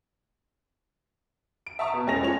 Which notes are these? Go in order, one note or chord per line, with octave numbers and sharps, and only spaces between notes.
D7
E5 A5 A#5 C#6 D#6
B2
F1 G#3 C#4 A4 A#6 F7
F3 C#4 C#5 F7